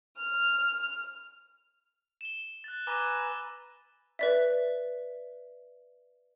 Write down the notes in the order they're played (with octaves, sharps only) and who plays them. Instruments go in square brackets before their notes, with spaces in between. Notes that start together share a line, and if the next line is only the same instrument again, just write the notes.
[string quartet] F6
[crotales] E7 G7
F#6 A6
[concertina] B4 G#5 A#5 [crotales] D6 E6 G7
[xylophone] B4 D5 E5